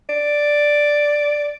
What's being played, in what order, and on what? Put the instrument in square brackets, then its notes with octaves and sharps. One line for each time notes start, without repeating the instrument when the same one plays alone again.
[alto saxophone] D5